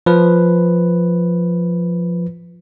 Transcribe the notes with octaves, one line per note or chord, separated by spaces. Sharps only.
F3 B4